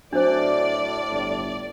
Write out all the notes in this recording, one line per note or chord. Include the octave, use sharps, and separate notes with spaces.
A2 F#3 D4 C5 D5
G1